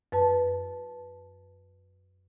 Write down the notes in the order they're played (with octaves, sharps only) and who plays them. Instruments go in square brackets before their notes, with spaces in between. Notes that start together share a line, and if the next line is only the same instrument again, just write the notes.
[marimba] F#2 B4 A5